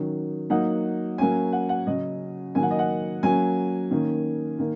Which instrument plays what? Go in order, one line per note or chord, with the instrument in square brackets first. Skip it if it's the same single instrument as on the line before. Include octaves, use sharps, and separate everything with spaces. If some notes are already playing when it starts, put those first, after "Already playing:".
Already playing: [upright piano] D#3 F#3 C#4
F#3 A#3 D#4 F#5
F#3 A#3 C#4 G#5
F#5
F#5
C#3 F#3 C#4 D#5
D#3 F#3 A#3 G#5
F#5
D#5
F#5
F#3 A#3 C#4 G#5
D#3 A#3 C#4
D#3 A#3